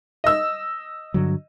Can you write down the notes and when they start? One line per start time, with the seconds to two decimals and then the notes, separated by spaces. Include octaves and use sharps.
0.24 D#5 E6
1.14 G2 D3 F#3